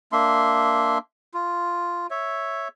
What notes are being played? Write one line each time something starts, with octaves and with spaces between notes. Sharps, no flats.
A#3 D4 E5 C6
F4
C#5 E5